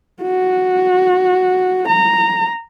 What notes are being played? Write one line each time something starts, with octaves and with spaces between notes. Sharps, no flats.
F#4
A#5